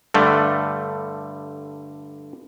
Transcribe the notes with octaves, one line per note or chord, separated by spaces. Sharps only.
G2 D3 G3 A3